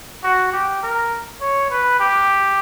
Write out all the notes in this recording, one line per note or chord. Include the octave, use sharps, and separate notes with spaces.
F#4
G4
A#4
C#5
B4
G4